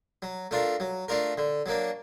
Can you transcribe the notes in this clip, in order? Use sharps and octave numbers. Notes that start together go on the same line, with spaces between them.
F#3
A3 D4 F4 A#4
F#3
A3 D4 F4 A#4
D3
F#3 A#3 D4